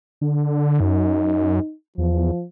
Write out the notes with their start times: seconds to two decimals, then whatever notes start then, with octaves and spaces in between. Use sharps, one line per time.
0.21 D3
0.80 F#2 D#4
1.98 E2 F3